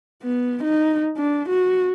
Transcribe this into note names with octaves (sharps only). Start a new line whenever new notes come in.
B3
D#4
D4
F#4